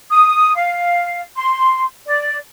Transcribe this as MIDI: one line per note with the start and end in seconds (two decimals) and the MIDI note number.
0.10 0.54 87
0.55 1.21 77
1.36 1.83 84
2.06 2.35 74